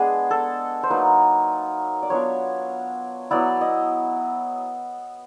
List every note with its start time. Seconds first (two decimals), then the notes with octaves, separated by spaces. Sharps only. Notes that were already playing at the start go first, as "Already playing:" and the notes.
Already playing: G#3 B3 D4 G#4
0.31 A4
0.83 C5
0.90 F#3 A#3 D#4 B4
2.03 D5
2.10 F#3 B3 D4 F4 C#5
3.30 F#3 B3 E4 D5
3.61 D#5